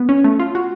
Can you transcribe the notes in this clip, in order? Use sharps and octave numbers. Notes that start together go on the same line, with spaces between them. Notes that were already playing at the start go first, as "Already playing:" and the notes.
Already playing: B3
C#4
A3
F4
F#4